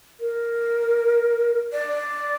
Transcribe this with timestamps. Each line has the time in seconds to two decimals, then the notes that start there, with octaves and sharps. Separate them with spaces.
0.20 A#4
1.73 D5